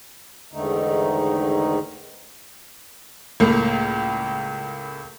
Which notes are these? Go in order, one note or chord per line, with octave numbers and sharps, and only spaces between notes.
E2 G#2 D3 D#3 A3 D#4
C#2 A2 A#3